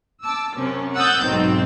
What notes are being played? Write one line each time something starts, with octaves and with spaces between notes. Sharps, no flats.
A5 D6 E6
F#2 C3 C#4
F#5 D#6 E6 F#6 G6 A6
B1 G#2 D#3 C4